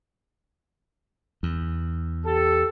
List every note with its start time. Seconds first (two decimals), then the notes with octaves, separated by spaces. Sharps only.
1.43 E2
2.26 G4 A4